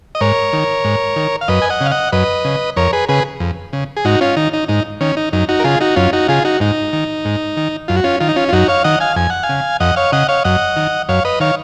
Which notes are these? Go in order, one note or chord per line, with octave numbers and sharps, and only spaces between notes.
D#5
G#2 A#4 C#5
D#3
G#2
D#3
F5
F#2 B4 D#5
G#5
D#5 F#5
C#3
F5
D#5 F#5
F#2 B4 D#5
C#3
F2 A#4 C#5
G#4 B4
C#3 G#4 B4
F2
C#3
G#4
G#2 D#4 F#4
C#4 F4
D#3 D#4
D#4
G#2 D#4
D#3 C#4
D#4
F#2 D#4
D#4 F#4
A#4
C#3 F4 G#4
D#4 F#4
F#2 C#4 F4
D#4 F#4
C#3 F4 G#4
D#4 F#4
G#2 D#4
D#3
G#2
D#3
F#2 F4
F#4
C#4 F4
D#3 F4
D#4
C#4 F4
F4
F#2 D#4 F#4
C#5 F5
D#3 D#5 F#5
F5 G#5
F2 G#5
F#5
F5 G#5
C#3
F2 D#5 F#5
C#5 F5
C#3 D#5 F#5
C#5 F5
F#2 D#5 F#5
D#3
F#2 C#5 F5
B4 D#5
D#3 C#5 F5